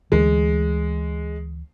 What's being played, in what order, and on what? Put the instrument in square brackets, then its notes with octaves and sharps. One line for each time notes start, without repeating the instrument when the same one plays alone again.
[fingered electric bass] D2 D3 E3 [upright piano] G#3